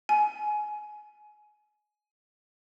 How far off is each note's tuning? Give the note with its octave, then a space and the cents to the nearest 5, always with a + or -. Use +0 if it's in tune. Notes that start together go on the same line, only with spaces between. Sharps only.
G#5 +20